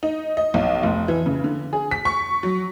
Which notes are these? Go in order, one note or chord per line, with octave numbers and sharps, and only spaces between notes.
D#4
D#5
B1
F1
E3
C#3
D3
G#4
B6
C#6
F#3